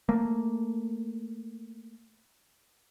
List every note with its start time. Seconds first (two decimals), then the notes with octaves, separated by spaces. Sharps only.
0.09 A3 A#3